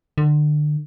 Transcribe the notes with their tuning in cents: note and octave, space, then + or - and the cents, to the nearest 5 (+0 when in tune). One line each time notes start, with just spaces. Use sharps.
D3 +30